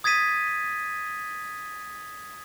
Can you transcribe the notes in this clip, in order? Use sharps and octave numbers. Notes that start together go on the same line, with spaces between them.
D#6 G#6 A6 B6 D#7